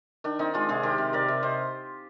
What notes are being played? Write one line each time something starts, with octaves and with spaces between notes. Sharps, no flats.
D#3 D4
D#3 C4 D#4
G#3 D4 F4
C3 F4 G#4
D#3 G4 A#4
C3
C3 A#4 D5
C3
C3 C5 D#5